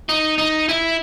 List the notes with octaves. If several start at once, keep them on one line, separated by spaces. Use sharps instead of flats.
D#4
D#4
E4